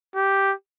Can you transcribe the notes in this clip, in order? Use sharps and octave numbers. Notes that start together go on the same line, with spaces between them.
G4